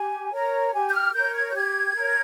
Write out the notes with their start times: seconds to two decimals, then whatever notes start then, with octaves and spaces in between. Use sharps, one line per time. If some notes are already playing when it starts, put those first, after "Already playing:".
Already playing: G4 G#5
0.32 A#4 C#5 A#5
0.73 G4 G#5
0.89 G6
0.94 F6
1.14 A#4 C#5 G6
1.35 G#6
1.50 G6
1.55 G4 G#6
1.95 A#4 C#5